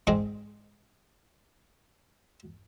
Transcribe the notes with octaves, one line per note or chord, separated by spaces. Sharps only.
G#2 C4 G#4 D5 D#5